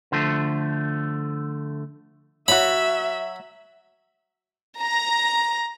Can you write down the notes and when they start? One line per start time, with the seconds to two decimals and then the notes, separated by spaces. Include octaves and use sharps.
0.12 D3 F3 A3
2.48 F#3 F#4 E5 B5
4.80 A#5